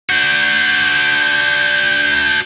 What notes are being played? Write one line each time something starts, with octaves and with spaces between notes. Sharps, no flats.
D4 F#4 G6